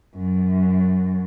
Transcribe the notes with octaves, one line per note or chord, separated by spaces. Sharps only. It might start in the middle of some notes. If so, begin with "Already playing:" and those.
F#2